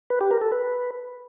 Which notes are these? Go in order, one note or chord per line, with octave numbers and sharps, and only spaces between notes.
B4
G4
A#4
A4
B4